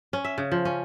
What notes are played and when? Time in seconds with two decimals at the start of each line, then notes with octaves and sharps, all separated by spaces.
0.13 C#4
0.25 E5
0.38 C#3
0.52 F3
0.65 C#4